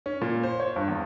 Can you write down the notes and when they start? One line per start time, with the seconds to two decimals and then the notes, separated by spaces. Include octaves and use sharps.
0.06 C#4
0.21 A#2
0.44 C5
0.60 C#5
0.76 G2
0.88 E2